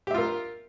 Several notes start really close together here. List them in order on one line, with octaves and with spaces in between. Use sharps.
G4 E5 F4 A#4